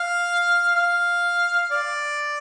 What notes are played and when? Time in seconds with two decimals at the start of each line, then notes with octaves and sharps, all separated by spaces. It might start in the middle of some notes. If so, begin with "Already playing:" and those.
Already playing: F5
0.76 F5
1.71 D5